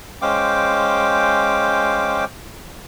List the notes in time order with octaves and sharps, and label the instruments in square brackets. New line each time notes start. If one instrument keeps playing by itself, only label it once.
[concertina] G#3 C#4 C5 F5 G5 D6